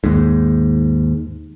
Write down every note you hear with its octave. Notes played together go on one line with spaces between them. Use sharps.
D#2 G#2